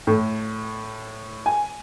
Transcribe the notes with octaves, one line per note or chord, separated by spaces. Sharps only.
A2
G#5